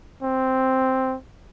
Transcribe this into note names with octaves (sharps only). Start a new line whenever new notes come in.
C4